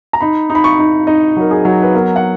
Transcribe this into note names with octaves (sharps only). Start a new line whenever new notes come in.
A#5
D#4 B5
D#4
B5
C#6
D#4
D#4 D#5
F#3 A#4
G#4
F#3
B4
B3 A#4
F#5